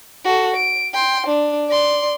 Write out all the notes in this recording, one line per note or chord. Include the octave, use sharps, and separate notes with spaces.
F#4 A4
D7
G5 C6
D4
D5 C6